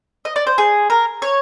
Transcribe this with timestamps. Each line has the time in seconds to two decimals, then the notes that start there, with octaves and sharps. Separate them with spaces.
0.25 D#5
0.36 D5
0.47 C5
0.58 G#4
0.90 A#4
1.22 C#5